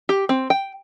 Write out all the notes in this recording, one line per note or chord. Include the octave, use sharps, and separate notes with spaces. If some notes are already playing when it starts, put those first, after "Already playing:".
G4
C4
G5